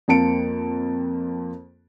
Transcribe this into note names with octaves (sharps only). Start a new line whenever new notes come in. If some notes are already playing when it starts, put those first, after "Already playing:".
F2 A#3 C4 A5 C#7 D7